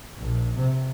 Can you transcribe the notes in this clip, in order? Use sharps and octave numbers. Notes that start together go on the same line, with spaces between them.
A#1
C3